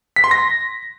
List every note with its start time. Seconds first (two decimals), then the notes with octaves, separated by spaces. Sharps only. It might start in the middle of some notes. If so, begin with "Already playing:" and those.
0.16 B6
0.24 C6
0.31 A#6